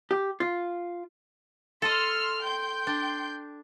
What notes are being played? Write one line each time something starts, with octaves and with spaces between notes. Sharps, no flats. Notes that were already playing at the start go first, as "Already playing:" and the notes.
G4
F4
A4 D#5 C6 E6 F6
G5 C6 G6
D4